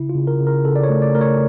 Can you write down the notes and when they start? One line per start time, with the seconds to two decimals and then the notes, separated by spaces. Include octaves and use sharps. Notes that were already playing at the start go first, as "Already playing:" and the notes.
Already playing: C#3 E4
0.10 F4
0.15 C#3
0.27 A#4
0.40 C#3
0.47 A#4
0.65 C#3 A4
0.76 D5
0.83 C#5
0.90 A3
1.02 D5
1.14 A3 A#4
1.21 C#5